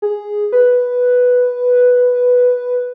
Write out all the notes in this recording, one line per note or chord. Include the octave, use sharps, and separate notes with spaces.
G#4
B4